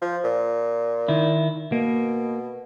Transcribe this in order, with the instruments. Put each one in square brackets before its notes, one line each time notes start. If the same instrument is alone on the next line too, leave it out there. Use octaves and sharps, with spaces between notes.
[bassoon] F3
A#2
[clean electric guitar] D#3 E4
[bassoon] B2 [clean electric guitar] A#3